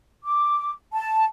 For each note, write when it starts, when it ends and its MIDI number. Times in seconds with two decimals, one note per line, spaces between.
0.25 0.73 86
0.93 1.26 81